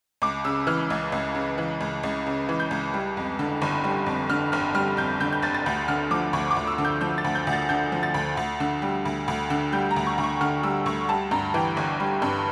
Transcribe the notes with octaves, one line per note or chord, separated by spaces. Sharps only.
C#2 D6
C#3 E6
E3 F6
C#2
C#2
C#3
E3
C#2
C#2
C#3
E3
G6
C#2
G3
F2
D3
G1
G3
F2
D3 F6
G1 F6
G3 F6
F2 G6
D3 G6
G6
G1 A6
A6
D2 G6
D3 F6
F3 D6
D2 C#6
D6
D2
E6
D3
G6
F3 G6
A6
D2
G6
D2
A6
D3 G6
F3
A6
D2
D2
D3
G3
D2
D2
D3
G3 G6
A#5
D2
C#6
D2
C#6
D3 F6
G3 E6
D2 C#6
G3 A5
G2 A#5
E3 G5
G1
G3
G2